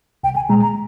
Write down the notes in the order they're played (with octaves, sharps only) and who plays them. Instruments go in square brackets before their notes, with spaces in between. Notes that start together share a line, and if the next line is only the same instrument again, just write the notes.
[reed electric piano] C2 [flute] G5
[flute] G#5
[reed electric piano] A#2 G#3 [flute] A#5
[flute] A#5